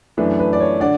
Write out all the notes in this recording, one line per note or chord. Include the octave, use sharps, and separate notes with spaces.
F#2 E3 A3 D4 B4
B4
D5
C#5
D3 D5 F#5